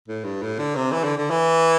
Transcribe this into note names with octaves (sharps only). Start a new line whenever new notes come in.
A2
G2
A2
D3
C3
E3
D3
D3
E3